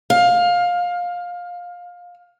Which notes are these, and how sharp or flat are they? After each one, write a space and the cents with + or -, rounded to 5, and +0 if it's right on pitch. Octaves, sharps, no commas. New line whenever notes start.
F5 +20